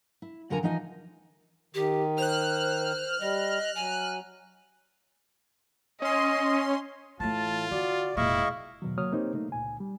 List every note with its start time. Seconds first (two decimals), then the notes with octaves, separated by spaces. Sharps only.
0.22 E4
0.50 F2 D3 A#4 F#5 G#5 A#5
0.63 E3 F3 D#4 D#5 F5 G#5
1.75 D#3 G4
2.18 C5 F6 F#6
3.20 G3 D#5
3.75 F#3 G#5
6.02 C#4 D#5 C6
7.20 A2 E3 A3 F4 A5
7.71 D3 F#4 D5
8.17 F1 A#2 G#3 E4 D#5 F5 C#6
8.82 E2 B2 D#3 F#3
8.98 D3 F#3 A#3 C#5 D#6 F6
9.12 A#3 C4 D#4 G4 C5 C#5
9.35 A3 A#3 D#4
9.52 C#2 A#2 G#5
9.80 G3